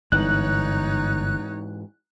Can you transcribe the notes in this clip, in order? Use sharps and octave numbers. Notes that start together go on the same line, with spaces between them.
G1 G#2 E3 D#4 C#5 F#6